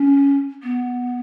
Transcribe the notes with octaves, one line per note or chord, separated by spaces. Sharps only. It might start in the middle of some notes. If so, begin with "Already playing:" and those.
Already playing: C#4
B3